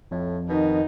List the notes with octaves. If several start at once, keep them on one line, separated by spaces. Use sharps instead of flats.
F2 A2
B2 D#3 D#4